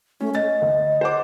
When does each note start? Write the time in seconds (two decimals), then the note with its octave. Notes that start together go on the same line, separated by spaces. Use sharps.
0.21 A3 C#4
0.35 D#5 A6
0.62 D2
1.01 C5 F#5 D6